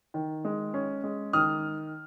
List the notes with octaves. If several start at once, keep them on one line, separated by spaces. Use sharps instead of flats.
D#3
G#3
C#4
G#3
D#3 D#6 F6